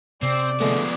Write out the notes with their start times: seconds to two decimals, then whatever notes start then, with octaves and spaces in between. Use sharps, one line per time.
0.22 C3 C4 D5
0.60 D3 F3 G#3 A3 B3